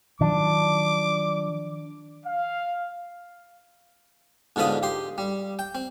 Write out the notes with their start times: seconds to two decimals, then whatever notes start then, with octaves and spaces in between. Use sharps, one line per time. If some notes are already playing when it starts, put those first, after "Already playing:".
0.21 D#3 F3 F#3 D4 D6
2.26 F5
4.56 G#2 B2 D3 F4 B5 D#6
4.83 G4 C6
5.18 G3
5.59 G5
5.75 C4